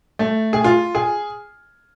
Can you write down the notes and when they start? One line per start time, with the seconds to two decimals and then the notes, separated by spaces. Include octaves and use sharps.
0.19 A3
0.53 G#4
0.64 F4
0.95 G#4